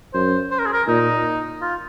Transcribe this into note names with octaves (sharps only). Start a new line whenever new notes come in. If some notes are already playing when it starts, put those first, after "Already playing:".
F#2 C5
C5
A#4
G#4
A#4
A#2 D#4
F4